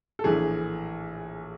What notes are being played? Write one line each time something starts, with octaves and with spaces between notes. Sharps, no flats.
A4
A#1 A2 E3 A3 G#4